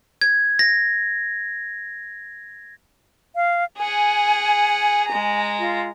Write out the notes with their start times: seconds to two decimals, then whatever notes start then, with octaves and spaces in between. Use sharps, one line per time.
0.21 G#6
0.59 A#6
3.35 F5
3.78 G#4 F#5 G#5
5.08 G#3 A#5
5.59 F4